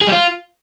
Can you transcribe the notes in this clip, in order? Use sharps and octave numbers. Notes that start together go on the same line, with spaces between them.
G#4
G3
F4